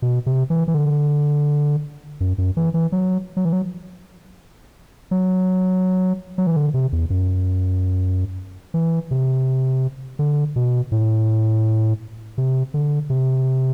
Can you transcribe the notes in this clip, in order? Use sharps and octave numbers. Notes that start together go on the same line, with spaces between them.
B2
C3
E3
E3
D3
F#2
F#2
E3
E3
F#3
F#3
E3
F#3
F#3
F#3
E3
D3
C3
E2
F#2
E3
C3
D3
B2
A2
C3
D3
C3